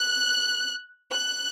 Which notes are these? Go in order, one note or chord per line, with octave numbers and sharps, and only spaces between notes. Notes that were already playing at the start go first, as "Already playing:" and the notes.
Already playing: F#6
F#6